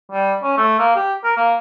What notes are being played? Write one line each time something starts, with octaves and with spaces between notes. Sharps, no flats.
G3
C#4
A3
A#3
G4
A#4
A#3